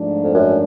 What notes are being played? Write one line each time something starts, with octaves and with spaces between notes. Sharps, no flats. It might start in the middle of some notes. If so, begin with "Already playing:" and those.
Already playing: G#2 F3 A3 D4
F2
F#2